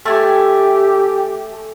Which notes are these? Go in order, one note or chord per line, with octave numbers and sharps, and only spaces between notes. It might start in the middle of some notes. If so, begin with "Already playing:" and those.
A3 G4 G#5